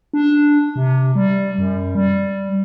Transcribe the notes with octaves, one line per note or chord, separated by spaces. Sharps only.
D4
C3
G3
F#2
G3